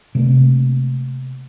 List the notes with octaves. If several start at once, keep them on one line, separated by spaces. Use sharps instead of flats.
C3 A3 A#3